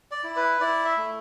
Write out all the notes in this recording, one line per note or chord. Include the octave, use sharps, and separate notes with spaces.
D5
E4
B4
E4 D5
E5
A3